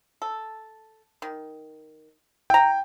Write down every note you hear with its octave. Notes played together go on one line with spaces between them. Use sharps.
A4
D#3
E4 G5 A#5